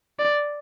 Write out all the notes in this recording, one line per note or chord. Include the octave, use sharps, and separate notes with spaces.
D5